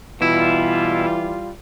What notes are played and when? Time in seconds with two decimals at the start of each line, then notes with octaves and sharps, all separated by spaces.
0.21 B2 E3 G3 E4 F4